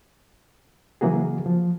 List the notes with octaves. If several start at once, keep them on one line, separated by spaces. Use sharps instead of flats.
C#3 E3 F#3 A#3 F#4 G#4
F3